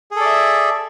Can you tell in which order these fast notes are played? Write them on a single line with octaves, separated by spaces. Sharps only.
G#4 A4 D5 E5